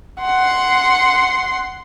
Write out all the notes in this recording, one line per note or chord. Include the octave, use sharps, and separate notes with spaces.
F#5 C6